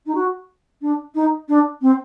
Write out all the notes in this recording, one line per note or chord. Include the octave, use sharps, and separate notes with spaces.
D#4
F#4
D4
D#4
D4
C4